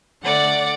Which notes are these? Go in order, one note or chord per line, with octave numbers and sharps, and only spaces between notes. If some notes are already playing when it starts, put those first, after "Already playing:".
D3 A3 D5 F#5